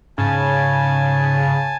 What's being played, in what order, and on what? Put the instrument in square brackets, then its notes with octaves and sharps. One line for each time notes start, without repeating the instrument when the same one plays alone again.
[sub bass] G#2 [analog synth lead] C#3 [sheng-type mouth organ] G#5 A5